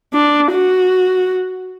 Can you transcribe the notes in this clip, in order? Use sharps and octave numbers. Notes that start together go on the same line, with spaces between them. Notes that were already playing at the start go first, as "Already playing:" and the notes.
D4
F#4